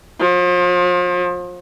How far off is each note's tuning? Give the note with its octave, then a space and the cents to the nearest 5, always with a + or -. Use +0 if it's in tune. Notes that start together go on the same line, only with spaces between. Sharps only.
F3 +35